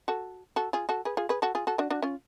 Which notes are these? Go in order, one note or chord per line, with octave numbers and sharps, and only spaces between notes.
F#4 A4
F#4 A4
F4 G#4
F#4 A4
G#4 B4
F4 G#4
G#4 B4
F#4 A4
F4 G#4
F#4 A4
D4 F#4
D4 F#4
C#4 F4